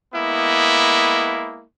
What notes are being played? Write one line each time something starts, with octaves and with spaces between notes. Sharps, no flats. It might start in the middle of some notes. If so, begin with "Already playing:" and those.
G#3 A#3 B3 E4